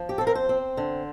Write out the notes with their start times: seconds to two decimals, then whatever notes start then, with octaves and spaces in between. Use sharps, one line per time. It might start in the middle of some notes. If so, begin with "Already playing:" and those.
Already playing: F3
0.09 G4
0.18 C4 A4
0.27 A#4
0.35 C5
0.49 C4
0.77 D3